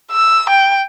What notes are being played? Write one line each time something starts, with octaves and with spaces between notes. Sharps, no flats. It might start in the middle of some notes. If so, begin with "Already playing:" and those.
E6
G5